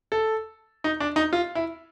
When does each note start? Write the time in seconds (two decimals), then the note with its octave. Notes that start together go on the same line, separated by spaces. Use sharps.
0.12 A4
0.84 D#4
1.00 D4
1.16 D#4
1.33 F4
1.55 E4